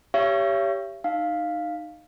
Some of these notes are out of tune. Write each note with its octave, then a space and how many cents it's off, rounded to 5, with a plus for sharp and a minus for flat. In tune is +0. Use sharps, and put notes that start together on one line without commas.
G4 +0 C#5 +20 E5 +45
D#4 -15 F5 +0